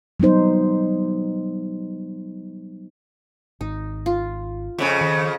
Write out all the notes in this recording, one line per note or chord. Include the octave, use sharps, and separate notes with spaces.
F#3 G3 B3 D#4 C5
G#1 D#4
F4
F2 C#3 C#4 E5
D#3